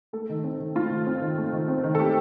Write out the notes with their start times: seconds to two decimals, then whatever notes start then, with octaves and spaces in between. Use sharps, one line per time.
0.13 A3 A4
0.29 D#3
0.44 C4
0.59 D#3
0.75 A3 F4
0.90 D#3
1.07 C4
1.22 D#3
1.38 A3
1.52 D#3
1.68 C4
1.84 D#3
1.95 A4
1.99 A3 G4